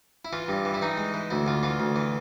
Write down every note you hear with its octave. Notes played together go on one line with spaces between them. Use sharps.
E4
E3 F4
G2
E3
E4
E3 D#4
G#3
E3
D2 E4
D2 F4
E3 F4
D2
E3